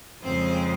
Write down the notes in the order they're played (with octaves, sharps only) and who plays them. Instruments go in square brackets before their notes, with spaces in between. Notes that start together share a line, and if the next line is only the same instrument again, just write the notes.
[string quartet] F2 C#3 G#3 C4 C5